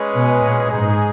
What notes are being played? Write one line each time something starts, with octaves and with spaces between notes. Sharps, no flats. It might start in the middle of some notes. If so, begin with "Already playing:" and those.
Already playing: G#3 C#4 G#4 B4
B2
A#2
G#2 G#3 D#4 G#4